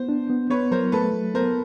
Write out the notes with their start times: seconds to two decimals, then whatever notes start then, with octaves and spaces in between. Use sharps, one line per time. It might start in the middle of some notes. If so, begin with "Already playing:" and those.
Already playing: B3 C5
0.09 D4
0.30 B3
0.50 B3 B4 C#5
0.71 F#3 A#4 C5
0.92 A3 A4 B4
1.13 F#3
1.34 B3 A#4 C5